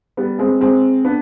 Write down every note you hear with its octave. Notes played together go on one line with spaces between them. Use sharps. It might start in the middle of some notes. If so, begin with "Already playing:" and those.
G3 B3
G#3 C4
G#3 C4
B3 D4